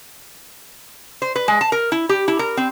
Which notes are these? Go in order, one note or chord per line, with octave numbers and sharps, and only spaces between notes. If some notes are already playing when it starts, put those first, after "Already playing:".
C5
B4
G#3
A5
A#4
E4
G4
E4
A#4
C4